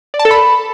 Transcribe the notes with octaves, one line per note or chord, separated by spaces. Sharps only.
D5
A5
A4
B5